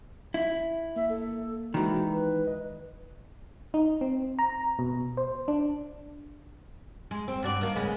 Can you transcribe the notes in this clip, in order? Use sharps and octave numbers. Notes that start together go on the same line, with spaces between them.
E4
A#3 E5
A4
D#3 E3 G#3 F#4 D5
B4
D#5
D#4
C4
A#5
B2
C5
D4
G#3
C4
G2 F#4 D5
D#3 A#3
C#3 G#3 B3